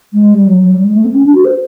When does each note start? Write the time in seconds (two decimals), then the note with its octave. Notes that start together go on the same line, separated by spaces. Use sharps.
0.13 G#3
0.33 G3
0.47 F#3
0.60 F#3
0.74 G3
0.84 G#3
0.95 A3
1.05 C4
1.14 C#4
1.25 D4
1.34 F#4
1.45 C5